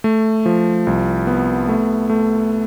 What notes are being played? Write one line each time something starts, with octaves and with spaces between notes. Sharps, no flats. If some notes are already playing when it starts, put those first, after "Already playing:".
A3
F3
C2
B3
A3
A3